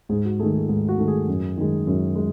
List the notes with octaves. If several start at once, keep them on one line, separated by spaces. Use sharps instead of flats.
G#2 G#4
F#4
D#3 A3 G#4
G#4
G#2 G#4
F#4
D#3 A3
G#4
F#2
D#3 G#3
F#2
G#3